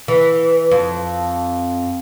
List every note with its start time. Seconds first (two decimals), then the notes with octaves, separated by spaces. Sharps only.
0.08 E3
0.71 F2